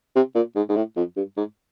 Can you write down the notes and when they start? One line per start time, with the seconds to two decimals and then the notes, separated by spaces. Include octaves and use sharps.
0.16 C3
0.35 A#2
0.56 G#2
0.69 G#2
0.76 A2
0.97 F2
1.16 G2
1.37 G#2